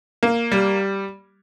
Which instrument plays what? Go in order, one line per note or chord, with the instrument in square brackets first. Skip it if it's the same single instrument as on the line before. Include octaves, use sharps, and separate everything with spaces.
[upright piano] A#3
G3